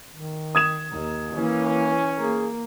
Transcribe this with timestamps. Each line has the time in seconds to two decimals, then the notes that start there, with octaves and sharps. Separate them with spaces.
0.12 D#3
0.55 D#6 G#6 E7
0.91 D#2
1.35 E3 A#3 C#4
2.17 A#3 G#4